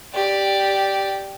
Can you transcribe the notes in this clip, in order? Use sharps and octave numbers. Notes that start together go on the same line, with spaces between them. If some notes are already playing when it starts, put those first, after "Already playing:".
G4 D5